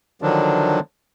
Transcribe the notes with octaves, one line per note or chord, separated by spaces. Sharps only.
D3 D#3 F3 F#3 D4